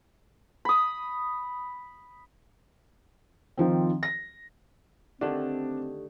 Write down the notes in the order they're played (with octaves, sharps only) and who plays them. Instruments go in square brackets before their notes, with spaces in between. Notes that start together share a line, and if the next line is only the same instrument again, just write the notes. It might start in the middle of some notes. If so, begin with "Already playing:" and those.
[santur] B5 D#6
[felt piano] D#3 F3 C4
A#6
[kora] D3 D#3 A3 [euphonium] C4 [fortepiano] D4 [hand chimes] G4 A4